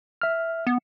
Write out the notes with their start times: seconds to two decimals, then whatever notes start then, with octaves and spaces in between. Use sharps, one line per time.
0.22 E5 F6
0.67 B3